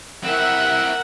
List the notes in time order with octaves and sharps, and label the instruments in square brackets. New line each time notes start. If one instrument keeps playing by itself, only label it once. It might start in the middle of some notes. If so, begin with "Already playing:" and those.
[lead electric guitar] C4 E4 [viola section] A#4 E5 F#5